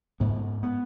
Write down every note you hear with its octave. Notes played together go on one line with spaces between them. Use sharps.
G#2 B3
B3